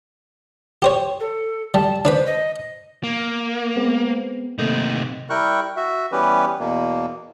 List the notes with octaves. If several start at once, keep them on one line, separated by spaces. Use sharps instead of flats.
G4 C5 C#5
A4
G3 A5
D4 B4 C5 B5
D#5
A#3
G#3 B3 C4
C3 D#3 A3 A#3 D#4
G3 E4 A#4 G5 C#6 F#6
F#4 E5
E3 G3 B3 C#4 G4 B4
E2 B2 A#3